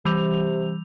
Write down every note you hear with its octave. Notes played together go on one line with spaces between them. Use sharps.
C3 E3 G3 F7